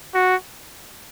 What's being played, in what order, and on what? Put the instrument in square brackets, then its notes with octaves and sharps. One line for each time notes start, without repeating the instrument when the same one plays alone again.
[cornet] F#4